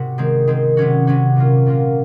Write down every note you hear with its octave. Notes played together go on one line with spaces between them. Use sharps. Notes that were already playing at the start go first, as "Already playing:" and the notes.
Already playing: G#2 C3 F#4 A#4
D#3 G#3 C4
D#3 G#3 C4
C3 F#3 C#4 F#4
C3 F#3 C#4 F#4
A#2 F#3 A#3 F4
A#2 F#3 A#3 F4